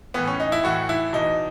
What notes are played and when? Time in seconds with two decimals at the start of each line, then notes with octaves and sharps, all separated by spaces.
0.14 A2 E3 B3
0.27 C#4
0.40 D#4
0.52 E4
0.63 A2 E3 F#4
0.89 E4
1.13 E2 B2 D#4